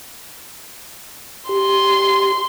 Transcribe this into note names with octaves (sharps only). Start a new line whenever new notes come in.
G4 C6